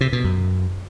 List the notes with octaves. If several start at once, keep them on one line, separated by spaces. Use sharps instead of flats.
C3
B2
F#2